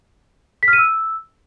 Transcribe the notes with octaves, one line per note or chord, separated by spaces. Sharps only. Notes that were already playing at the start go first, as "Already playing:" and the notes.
B6
F6
D#7
E6